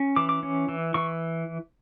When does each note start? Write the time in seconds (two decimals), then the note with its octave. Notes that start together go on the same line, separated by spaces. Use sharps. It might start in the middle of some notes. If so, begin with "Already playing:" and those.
Already playing: C#4
0.16 E3 D6
0.29 D6
0.43 C#4
0.69 E3
0.94 E3 C#6